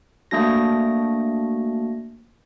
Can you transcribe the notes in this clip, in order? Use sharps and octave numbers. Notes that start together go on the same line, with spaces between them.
A3 A#3 D4 F#4 A#6